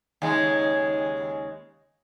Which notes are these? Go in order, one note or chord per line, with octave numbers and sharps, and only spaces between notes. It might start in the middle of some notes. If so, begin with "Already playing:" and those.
D#2 C#3 G#3